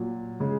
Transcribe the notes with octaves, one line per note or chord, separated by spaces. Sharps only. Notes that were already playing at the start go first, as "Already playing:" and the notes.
Already playing: A#2 F#3
C#3 G#3